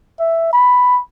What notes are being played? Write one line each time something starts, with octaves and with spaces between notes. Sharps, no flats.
E5
B5